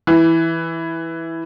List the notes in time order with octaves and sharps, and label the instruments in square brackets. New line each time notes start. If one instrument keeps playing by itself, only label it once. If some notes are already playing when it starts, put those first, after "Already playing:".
[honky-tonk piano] E3